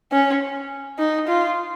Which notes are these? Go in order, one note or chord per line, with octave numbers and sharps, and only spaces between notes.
C#4
D#4
F4